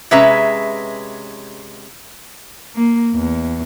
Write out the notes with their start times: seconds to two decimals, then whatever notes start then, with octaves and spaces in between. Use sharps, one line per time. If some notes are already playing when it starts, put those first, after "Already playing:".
0.11 C3 G#3 C#4 B4 E5 A#5
2.75 A#3
3.15 E2